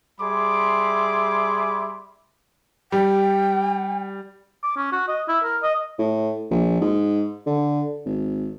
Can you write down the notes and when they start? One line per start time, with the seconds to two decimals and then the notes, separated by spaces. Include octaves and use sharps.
0.20 G3 G#4 E5 B5 C6 D6
2.92 G3 G5
4.63 D6
4.77 C#4
4.92 F#4
5.08 D#5
5.28 E4
5.44 A#4
5.63 D#5
5.99 A2
6.51 A#1
6.81 G#2
7.47 D3
8.06 G#1